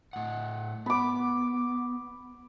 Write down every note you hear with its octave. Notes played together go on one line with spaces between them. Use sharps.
A2 F#5
B3 B5 D6